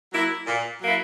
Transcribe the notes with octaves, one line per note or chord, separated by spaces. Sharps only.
F#3 A#3 E4
A#2
F#3 A#3 E4